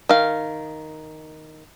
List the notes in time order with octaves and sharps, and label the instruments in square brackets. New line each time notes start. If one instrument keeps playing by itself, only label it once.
[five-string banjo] D#3 F5